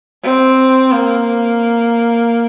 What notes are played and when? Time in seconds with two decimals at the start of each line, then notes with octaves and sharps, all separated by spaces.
0.23 C4
0.91 A#3